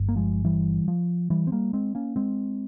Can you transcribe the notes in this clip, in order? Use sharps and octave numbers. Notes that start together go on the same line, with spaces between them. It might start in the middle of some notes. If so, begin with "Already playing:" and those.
Already playing: G1 G2
A#3
F3 G#3
E3 G3
F3
E3 G3
C4
G3 A#3
G#3 C4
A#3 C#4
G#3 C4